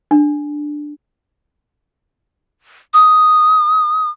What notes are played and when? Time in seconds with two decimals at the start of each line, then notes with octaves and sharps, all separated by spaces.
0.11 D4
2.94 D#6